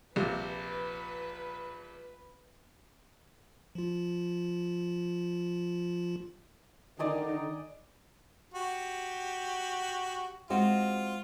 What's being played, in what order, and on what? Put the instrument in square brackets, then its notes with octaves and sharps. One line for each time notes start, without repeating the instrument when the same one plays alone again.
[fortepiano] A#1 C3 [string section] B4
[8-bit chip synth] F3 F4
[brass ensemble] D3 D#3 [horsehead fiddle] D#4 [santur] D5 D#5 G#5
[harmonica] F#4 G4
[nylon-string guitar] G#3 C4 F#4 [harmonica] F4